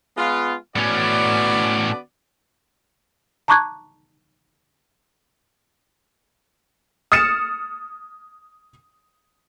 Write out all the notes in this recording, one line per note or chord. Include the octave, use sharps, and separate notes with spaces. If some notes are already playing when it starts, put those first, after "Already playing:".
G#3 B3 F4
A2 B3 C#4 F#4 D5
A5 A#5 C#6 D6 F#6 G#6
D#6 F6 A6 C#7 E7